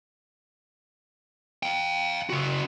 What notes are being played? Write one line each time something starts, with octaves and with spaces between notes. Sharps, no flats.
F5 G5
C#3 F#4